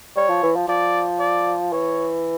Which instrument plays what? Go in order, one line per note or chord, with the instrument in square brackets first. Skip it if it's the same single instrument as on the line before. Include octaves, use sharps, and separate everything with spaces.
[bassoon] G3 [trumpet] C#5
[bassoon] F3
E3
F3
[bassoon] F3 [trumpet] D5
[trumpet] D5
[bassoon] E3 [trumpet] C#5